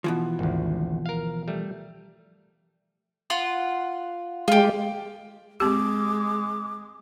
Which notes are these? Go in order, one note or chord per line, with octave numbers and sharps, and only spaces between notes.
B2 E3 F3
G#1 D2
A#4 F5
G3 A3
F4 F#5 C6
G#3 F4 G4
G#3 C4 G4 D6